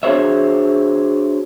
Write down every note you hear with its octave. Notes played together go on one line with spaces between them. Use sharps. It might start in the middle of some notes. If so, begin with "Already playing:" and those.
D4 F#4 G#4 C5 C#5 E5